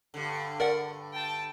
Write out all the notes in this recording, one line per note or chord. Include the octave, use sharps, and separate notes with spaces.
G2 D3
A#4 D5 F#5
G5 A5